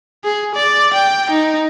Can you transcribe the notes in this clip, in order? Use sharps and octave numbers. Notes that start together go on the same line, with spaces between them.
G#4
D5
G5
D#4